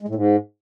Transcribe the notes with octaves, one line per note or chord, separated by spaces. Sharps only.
G#3
A2
G#2